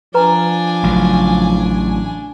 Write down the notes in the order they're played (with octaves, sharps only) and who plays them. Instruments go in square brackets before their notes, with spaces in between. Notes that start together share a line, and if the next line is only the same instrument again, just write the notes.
[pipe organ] F3 [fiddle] D4 G#5 [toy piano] B4 A#5
[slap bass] A1 C#3 F#3